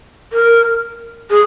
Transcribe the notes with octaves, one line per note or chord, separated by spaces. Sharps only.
A#4
G#4